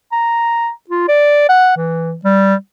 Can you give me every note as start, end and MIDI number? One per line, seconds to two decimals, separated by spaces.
0.12 0.70 82
0.90 1.03 65
1.08 1.46 74
1.49 1.72 78
1.77 2.15 52
2.25 2.55 55